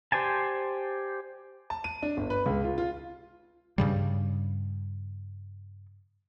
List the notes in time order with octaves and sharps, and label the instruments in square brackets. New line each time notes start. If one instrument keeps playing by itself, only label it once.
[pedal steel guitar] G4 C5 D5 G#5 A5
[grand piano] A5
D#7
D4
G1
B4
C#2
F4
F4
[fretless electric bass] G2 C#3 G3